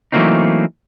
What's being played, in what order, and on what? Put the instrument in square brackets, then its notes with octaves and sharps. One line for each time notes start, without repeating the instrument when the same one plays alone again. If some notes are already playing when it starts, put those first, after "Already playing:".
[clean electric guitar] E3 F#3 A3 A#3 C4 D#4